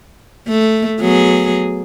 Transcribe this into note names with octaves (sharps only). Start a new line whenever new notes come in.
A3
F#3 B3 G#4